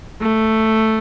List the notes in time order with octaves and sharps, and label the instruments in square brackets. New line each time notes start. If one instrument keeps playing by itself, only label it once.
[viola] A3